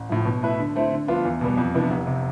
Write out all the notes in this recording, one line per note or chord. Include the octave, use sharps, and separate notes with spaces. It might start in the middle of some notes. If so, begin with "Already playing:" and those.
Already playing: A1
A2 F3
B2
A3 E4 B4 E5
D3
A3 C4 E4
D3
F3 B3 D4 F4
E2
B2 G3 B3
F2
C3 E3 B3 D4
F1
C3